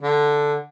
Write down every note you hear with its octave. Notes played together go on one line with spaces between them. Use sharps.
D3